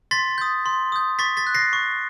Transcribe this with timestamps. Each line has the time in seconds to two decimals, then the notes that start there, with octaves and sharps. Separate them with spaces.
0.11 C6 A6 B6
0.38 D#6 G6
0.66 C6
0.92 D#6 G6
1.19 C#6 A6 B6
1.37 A6 B6
1.47 F#6
1.55 A#6 C7
1.73 C#6